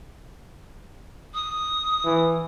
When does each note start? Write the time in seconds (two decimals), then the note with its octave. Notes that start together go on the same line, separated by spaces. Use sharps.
1.34 D#6
2.05 E3